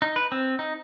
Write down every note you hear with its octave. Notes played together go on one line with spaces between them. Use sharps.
D#4
B4
C4
D#4